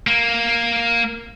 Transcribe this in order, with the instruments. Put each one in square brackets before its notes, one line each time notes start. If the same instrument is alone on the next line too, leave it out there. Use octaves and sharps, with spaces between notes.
[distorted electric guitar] A#3